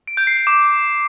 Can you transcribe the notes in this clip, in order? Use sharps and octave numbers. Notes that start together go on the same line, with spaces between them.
D7
G6
C7
G6
D6